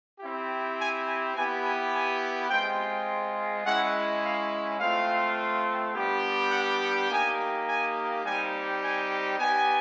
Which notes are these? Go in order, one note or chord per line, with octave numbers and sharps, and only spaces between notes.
C4 E4 G4
G#5
G#5
B3 E4 G4 G#5
G#5
G#5
G#3 C4 F4 G5
G#3 C#4 E4 F#5
F5
A3 C4 F4 F5
G3 B3 D4 G4
F#5
F#5
A#3 D#4 G4 G#5
G#5
G3 C4 D#4 G4 G#5
G#5
B3 D#4 G4 G#5